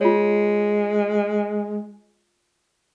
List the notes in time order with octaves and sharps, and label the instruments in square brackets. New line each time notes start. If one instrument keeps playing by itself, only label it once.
[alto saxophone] G#3 [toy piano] F4 C#5